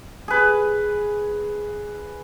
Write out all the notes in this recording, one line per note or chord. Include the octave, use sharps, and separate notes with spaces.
G#4 B4